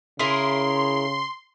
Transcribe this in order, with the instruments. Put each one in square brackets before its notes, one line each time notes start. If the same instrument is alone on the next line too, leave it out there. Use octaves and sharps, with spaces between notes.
[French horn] C#3 [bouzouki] E4 G#4 A#4 [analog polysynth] C6